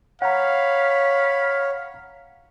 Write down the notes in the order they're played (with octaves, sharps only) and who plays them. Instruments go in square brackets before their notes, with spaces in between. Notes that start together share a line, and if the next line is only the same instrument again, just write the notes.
[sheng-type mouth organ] C#5 [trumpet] F5 [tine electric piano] F#5 A#5 [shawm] B5